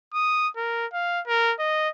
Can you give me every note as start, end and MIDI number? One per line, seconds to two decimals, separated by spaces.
0.14 0.48 87
0.57 0.86 70
0.93 1.21 77
1.27 1.54 70
1.59 1.89 75